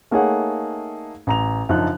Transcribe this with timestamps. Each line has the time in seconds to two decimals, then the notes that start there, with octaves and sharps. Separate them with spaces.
0.11 A3 A#3 D#4 G#4 C#5 F#5
1.27 A1 A#5 F7
1.69 F#2 C#3 F3 D4 D#4 F#6